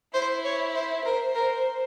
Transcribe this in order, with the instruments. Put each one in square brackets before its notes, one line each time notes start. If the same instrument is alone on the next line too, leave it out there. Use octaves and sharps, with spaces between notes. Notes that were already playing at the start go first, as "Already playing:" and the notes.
[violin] E4 [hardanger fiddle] C5
[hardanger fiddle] C#5
C5
[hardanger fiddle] A#4 [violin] C5
[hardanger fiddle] A#4